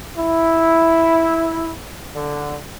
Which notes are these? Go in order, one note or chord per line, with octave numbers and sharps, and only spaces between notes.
E4
D3